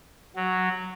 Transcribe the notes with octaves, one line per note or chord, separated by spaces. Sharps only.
F#3